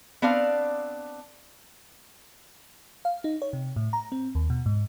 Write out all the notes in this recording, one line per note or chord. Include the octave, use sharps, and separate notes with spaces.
B3 C4 D4 D5 F5
F5
D#4
C#5
C3
A2
A#5
C4
D#2
B2
G#2